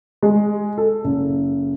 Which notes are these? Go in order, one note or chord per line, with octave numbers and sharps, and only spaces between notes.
G#3
A4
F#1